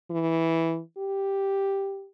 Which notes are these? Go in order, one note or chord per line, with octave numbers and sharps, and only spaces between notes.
E3
G4